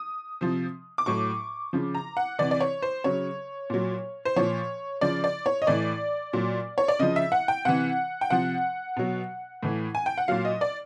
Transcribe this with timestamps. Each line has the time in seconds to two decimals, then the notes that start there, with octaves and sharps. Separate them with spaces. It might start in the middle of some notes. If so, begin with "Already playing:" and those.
Already playing: D#6
0.41 C3 F3
0.98 D6
1.06 A2 F#3 C#6
1.73 C#3 F3
1.95 A#5
2.17 F#5
2.39 C3 E3 D5
2.51 D5
2.61 C#5
2.82 C5
3.04 C#3 F#3 C#5
3.70 A#2 F#3
4.25 C5
4.36 A#2 F3 C#5
5.01 C#3 F3 D5
5.24 D5
5.46 C#5
5.62 D#5
5.67 A2 E3 D5
6.33 A#2 F#3
6.78 C#5
6.88 D5
6.99 C#3 F3 D#5
7.16 E5
7.32 F#5
7.48 G5
7.65 C3 E3 F#5
8.21 G5
8.30 C3 F3 F#5
8.96 B2 F#3
9.63 A2 E3
9.95 G#5
10.06 G5
10.18 F#5
10.28 A#2 F#3 F5
10.45 D#5
10.61 D5